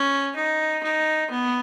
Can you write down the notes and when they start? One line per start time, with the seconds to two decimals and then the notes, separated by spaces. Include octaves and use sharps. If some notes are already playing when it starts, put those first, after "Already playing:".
Already playing: C#4
0.36 D#4
0.83 D#4
1.31 B3